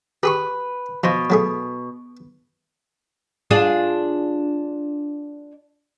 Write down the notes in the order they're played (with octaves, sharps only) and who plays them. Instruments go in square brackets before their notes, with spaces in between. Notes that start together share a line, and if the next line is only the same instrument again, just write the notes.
[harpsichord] G4 G#4 C#6 [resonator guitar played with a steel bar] B4
[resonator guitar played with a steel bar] B2 [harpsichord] F3 F4
[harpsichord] F#3 A3 G#4
[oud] D4 F4 G#4